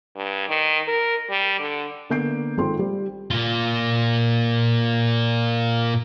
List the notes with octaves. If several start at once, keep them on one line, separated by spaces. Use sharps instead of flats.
G2
D#3
A#4
G3
D3
D3 A#3 B3 G6 C7 D7
G#1 C4 F4 A4 C6
G3
A#2 F4